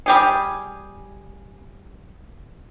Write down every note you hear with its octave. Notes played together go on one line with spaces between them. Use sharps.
G3 G4 G#4